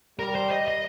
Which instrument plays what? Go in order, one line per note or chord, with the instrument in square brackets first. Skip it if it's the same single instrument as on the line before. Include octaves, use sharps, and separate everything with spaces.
[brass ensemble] G3 [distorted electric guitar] A#4
[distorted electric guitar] C5
D#5
D#5